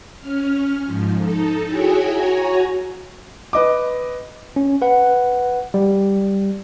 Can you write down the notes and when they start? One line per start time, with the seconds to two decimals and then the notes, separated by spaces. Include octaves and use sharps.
0.20 C#4 F6
0.85 G#2 F3
1.18 D#4 A4
1.67 E4 F#4 G#4 C#5 G5 G#5
2.11 F#4 C#5 G#5 A#5
3.53 B4 D#5 D6
4.56 C#4
4.82 B4 F#5
5.74 G3